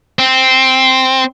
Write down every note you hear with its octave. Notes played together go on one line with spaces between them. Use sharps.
C4